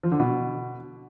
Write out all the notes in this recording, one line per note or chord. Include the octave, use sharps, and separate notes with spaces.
F3
D3
B2